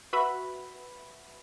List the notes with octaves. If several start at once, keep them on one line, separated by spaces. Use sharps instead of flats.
F#4 B4 E5 B5